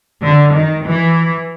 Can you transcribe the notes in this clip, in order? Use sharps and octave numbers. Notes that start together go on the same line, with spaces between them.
D3
D#3
E3